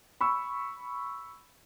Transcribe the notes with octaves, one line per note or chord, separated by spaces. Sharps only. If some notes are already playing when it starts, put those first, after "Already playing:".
B5 C#6 E6